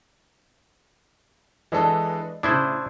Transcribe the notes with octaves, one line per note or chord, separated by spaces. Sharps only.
E3 G#3 D4 A4 B4 D#5
A2 C#3 D4 E4 C5 D#6 G#6